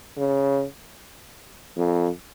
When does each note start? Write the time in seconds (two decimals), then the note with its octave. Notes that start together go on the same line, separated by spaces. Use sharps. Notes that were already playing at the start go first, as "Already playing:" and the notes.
0.17 C#3
1.77 F2